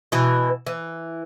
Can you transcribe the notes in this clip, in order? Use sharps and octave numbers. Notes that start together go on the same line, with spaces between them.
B2 E3
E3